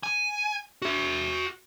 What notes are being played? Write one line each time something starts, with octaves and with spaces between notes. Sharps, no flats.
G#5
F#4 E5